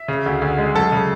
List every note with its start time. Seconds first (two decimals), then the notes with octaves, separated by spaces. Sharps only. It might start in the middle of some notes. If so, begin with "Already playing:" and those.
Already playing: E5
0.08 C#3
0.26 D2
0.42 D2
0.58 G#3
0.75 F#2 A4
0.92 C#3